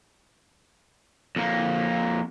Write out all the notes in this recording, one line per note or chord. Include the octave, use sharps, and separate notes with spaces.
F2 A#3